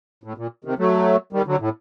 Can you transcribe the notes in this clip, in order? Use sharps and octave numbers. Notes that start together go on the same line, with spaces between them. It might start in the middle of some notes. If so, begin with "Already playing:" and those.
A2
A#2
C3 D#3
F#3 A3
D#3 G3
D3 F#3
A2